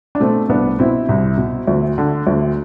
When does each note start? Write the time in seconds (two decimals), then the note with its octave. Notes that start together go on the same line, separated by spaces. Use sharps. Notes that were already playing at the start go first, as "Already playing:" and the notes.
0.15 D4
0.20 B2 A3 C4
0.49 C2 B3 D4
0.79 B2 C4 E4
1.09 C2
1.38 B2
1.67 D2
1.98 D3
2.27 D2